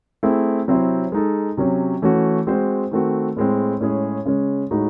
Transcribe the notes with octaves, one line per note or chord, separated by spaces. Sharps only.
A3 C4 E4 G#4
C3 F#3 C4 E4 C5
G#3 D#4 A4
C3 F#3 C#4
E3 A3 C#4 F#4
G#3 C4 F#4 C5
D#3 A3 C4 F#4
A2 G#3 C4
A2 G#3 C#4 G#4
C#3 G#3 C#4
A2 G#3 D#4 F#4